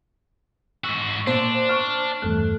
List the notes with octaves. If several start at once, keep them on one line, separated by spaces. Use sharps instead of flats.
G#2 F#4 E6
A#2 D4 C5
C#6 F6
E2 G2 A3 F#6